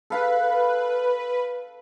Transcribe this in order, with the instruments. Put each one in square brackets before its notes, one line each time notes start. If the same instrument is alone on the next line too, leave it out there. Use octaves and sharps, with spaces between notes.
[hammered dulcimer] A4 F5 B5 [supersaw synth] B4